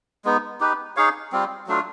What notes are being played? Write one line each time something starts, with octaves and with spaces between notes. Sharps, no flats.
G#3 B3 D#4
D#4 G4 B4
D#4 G#4 C#5 F5
G3 C4 F4
F#3 A3 D4 F4